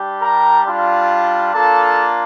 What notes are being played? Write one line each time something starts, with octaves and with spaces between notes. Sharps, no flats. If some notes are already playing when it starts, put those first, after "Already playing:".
Already playing: G3 D4 G4
A#4 A#5
G3 D4 F4
A#3 D4 F4 A4 A5